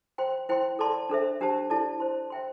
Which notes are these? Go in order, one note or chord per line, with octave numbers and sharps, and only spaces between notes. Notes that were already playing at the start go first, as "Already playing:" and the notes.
C5 G5 C6
E4 C5 G5 C6
A4 D5 A5 C6
D4 A4 C5 E5
D4 G4 C5 A5
E4 A4 D5 A5
C5 A5 C6
C5 E5 G5 C6